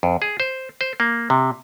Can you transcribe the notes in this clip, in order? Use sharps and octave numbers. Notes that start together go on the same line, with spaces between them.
F2
G#4
C5
C5
A#3
C3